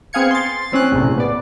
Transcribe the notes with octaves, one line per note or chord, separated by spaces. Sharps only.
B3 C4 G#4 F5 G#6 C#7
C6 A6
E3 C4 C#4 F#6
A#1 F#2 A2 C3
B3 D5